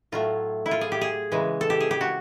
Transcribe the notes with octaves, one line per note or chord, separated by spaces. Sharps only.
A2 F#3 A3 F4
E4
F4
G#4
G4
G#4
C#3 E3 G#3
A4
G4
G#4
G4
F#4